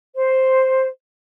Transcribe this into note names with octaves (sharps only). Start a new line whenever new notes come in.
C5